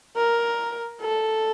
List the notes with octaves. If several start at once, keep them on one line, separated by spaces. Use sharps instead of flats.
A#4
A4